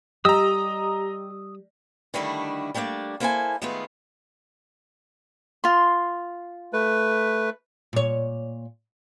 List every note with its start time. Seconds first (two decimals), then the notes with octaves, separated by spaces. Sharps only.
0.25 G3 G4 D#5 A#5 D#6 E6
2.14 D3 D#3 G3 A3 D4 E4
2.74 G3 A3 A#3 D4 D5
3.20 A#3 B3 E4 A4 C5 G#5
3.62 D#3 G#3 A3 B3 F4
5.64 F4 C6
6.73 A3 B4
7.93 A#2 C#5